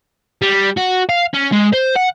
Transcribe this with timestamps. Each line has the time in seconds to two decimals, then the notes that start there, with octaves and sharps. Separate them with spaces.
0.42 G3
0.77 F#4
1.09 F5
1.34 C#4
1.53 G#3
1.73 C5
1.96 F#5